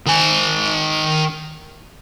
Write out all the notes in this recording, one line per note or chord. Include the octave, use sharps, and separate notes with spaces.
D#3 G#5